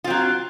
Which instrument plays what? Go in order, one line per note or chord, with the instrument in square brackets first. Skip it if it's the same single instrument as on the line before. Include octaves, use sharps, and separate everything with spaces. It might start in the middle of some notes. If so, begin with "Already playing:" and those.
[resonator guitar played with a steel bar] F4
C4
F#3